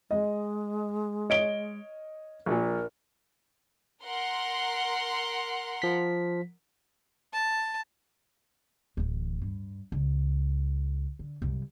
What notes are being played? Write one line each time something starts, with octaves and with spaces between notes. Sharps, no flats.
G#3 D#5
C#5 D#5 D7 G7
A#1 A#2 A#4
A#4 F#5 C6
F3 B6
A5
D1 E3
G2
C#2
D3
C2 F#2